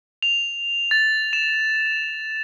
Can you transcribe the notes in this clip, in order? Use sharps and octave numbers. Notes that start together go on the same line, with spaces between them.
F7
A6
E7